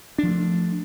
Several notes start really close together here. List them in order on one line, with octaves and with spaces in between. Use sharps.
D4 F3 A3